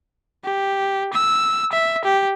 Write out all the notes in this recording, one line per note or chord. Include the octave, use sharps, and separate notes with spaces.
G4
E6
E5
G4